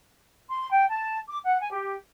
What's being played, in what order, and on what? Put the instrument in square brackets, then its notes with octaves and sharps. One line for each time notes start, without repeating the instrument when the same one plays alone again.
[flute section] C6
G5
A5
D6
F#5
G#5
G4